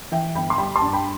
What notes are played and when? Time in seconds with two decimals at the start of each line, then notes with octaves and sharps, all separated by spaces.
0.12 E3 E5 G5
0.35 G1 G5 B5
0.50 C6
0.58 G3 G5 B5
0.76 A5 C6
0.82 G2
0.93 G5 B5